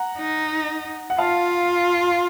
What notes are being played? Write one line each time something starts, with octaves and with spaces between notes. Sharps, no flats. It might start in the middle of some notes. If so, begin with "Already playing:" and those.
Already playing: F#5 A#5
D#4
F#5
F4 F5 A5